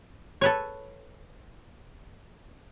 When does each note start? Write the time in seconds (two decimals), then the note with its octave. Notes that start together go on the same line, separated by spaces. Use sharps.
0.41 A4 B4 C#5